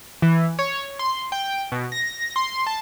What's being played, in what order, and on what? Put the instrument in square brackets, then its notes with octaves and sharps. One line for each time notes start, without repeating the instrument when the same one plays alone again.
[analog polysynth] E3
C#5
C6
G5
B2
A#6
C6
A5